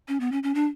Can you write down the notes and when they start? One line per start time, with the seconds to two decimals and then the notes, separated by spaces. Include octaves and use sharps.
0.08 C#4
0.20 B3
0.32 C#4
0.43 C#4
0.55 D4